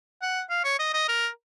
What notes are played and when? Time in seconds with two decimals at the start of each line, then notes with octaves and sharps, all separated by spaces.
0.22 F#5
0.50 F5
0.64 C#5
0.79 D#5
0.93 D#5
1.08 A#4